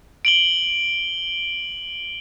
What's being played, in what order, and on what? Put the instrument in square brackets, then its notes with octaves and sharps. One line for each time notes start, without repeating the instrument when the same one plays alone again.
[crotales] D7 F#7 G7